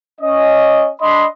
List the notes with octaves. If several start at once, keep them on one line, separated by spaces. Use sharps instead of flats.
C#4 D#5
D4 D#5 B5 C6